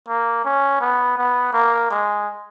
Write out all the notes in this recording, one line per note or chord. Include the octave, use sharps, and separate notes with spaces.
A#3
C#4
B3
B3
A#3
G#3